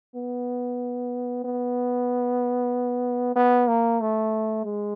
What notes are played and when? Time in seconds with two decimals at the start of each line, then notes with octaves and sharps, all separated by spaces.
0.16 B3
1.45 B3
3.36 B3
3.68 A#3
4.01 A3
4.65 G#3